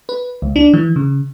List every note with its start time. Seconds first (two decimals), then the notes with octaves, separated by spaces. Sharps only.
0.09 B4
0.42 C#2
0.56 D4
0.74 E3
0.96 C#3